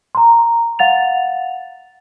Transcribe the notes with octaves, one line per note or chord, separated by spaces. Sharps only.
A#5 C6
F5 F#5 A6 F7